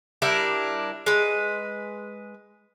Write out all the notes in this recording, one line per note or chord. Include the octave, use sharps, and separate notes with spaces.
G3 D4 E4 A#4
G#3 B4